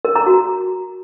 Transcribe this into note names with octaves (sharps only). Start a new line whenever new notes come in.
A#4
A#5
F#4